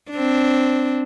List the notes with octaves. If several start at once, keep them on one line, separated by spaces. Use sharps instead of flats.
C4 D4